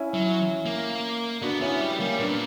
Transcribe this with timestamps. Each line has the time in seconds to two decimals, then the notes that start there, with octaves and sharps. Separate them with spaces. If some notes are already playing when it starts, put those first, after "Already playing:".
Already playing: C#4 E4
0.14 F#3
0.66 A#3
1.41 B3 D4 F#4
1.61 B3 C#4 E4
1.81 G3
1.99 G3 A#3 C#4
2.19 A#2 B3 D4